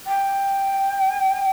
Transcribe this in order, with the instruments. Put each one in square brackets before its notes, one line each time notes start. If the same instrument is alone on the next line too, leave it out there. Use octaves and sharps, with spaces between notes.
[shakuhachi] G5